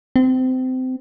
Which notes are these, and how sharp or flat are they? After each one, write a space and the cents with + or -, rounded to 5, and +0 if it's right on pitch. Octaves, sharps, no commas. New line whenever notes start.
C4 -25